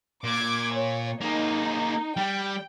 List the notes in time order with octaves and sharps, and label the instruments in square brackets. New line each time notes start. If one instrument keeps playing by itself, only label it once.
[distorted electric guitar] A#2 [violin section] D6 G#6
[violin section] C#5
[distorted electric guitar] A#3 G#4 [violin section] D#4
[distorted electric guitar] G3 [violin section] G5